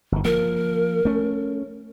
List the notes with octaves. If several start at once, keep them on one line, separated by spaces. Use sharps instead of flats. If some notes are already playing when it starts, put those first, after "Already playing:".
G1 D#3
F3 A#3 A#4
A3 C#4